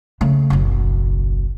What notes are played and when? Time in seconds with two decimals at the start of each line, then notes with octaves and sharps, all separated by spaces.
0.21 C#3 A3
0.50 F#1 B1